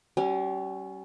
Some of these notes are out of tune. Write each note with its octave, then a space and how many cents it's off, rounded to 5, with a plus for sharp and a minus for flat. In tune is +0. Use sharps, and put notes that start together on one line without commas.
G3 -40 C#4 +0 G#5 +0